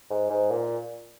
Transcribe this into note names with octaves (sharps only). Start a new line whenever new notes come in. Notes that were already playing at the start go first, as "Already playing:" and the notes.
G#2
G#2
A#2